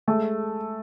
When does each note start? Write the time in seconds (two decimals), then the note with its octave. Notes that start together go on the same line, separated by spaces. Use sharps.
0.07 G#3 A3